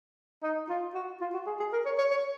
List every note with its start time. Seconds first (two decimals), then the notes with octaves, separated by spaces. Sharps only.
0.43 D#4
0.69 F4
0.94 F#4
1.21 F4
1.34 F#4
1.46 G#4
1.59 G#4
1.73 A#4
1.86 C#5
1.98 C#5
2.11 C#5